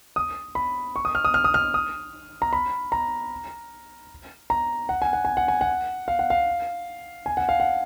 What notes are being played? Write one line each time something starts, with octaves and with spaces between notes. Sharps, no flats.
D#6
B5
C#6
D#6
F6
D#6
F6
D#6
F6
D#6
A#5
B5
A#5
A#5
F#5
G#5
F#5
G#5
F#5
G#5
F#5
F5
F#5
F5
G#5
F#5
F5
F#5